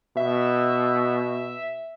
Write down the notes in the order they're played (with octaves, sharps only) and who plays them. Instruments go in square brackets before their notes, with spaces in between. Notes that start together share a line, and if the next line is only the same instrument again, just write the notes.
[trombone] B2 [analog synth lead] E5